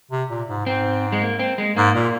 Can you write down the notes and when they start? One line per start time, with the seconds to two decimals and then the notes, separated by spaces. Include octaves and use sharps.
0.11 C3
0.30 A#2
0.49 G#2
0.66 G#2 C4
1.12 G#3
1.22 A#3
1.39 C4
1.58 G#3
1.77 G#2 A#3
1.95 A#2